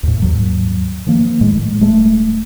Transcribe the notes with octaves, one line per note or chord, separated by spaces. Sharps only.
D#2 A2
D#2 G#2 F#3
D#3 F3 A#3
A2 G#3
D#1 G#3 A3